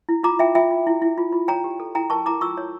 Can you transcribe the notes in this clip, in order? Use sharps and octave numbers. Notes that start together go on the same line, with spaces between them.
E4
F4 A#5 D6
F4 E5 G5
F4 E5 G5
F4
E4
E4
F4
F4
C#5 G5 A#5
G4
A4
E4 G5 A#5
A#4 A5 C#6
E4 A#5 D6
F4 C#6 E6
C#5